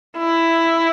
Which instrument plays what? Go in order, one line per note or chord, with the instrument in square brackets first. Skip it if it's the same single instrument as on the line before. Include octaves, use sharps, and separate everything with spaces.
[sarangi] E4